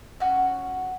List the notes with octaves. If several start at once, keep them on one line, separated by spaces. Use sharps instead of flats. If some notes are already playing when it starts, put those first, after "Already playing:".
C#4 F#4